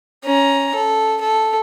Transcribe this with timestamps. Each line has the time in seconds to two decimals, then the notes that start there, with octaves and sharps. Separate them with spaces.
0.23 C#4 A#5
0.75 A4
1.21 A4